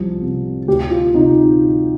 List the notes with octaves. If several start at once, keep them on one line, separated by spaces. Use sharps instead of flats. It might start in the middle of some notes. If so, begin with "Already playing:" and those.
Already playing: C2 F3
C3
D2 G4
F4
C3 D#4